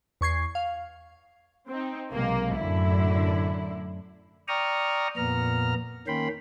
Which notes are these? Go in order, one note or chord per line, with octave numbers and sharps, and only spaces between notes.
E2 C#6 G#6 C7
F5
C4 D#4
B1 C3 G#3 A#3
F#2 A2 D3 E4
D5 G5 A#5 C#6 D#6 F6
F2 A#2 B3 A#5 F6
D#3 A#3 C#4 G5 B5 C6